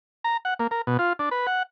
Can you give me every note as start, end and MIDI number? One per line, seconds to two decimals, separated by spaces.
0.24 0.37 82
0.45 0.54 78
0.59 0.67 58
0.71 0.82 70
0.87 0.97 47
0.99 1.13 65
1.19 1.29 62
1.31 1.46 71
1.47 1.63 78